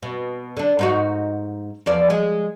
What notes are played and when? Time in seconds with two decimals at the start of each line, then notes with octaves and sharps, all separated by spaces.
0.03 B2
0.57 D3 D4
0.79 G#2 D#4 F#4
1.86 E2 F3 D5
2.10 G#3 G#4